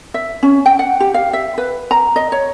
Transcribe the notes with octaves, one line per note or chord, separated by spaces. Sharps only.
E5
C#4
G5
F#5
G4
F5
E5
B4
A#5
D#5
C#5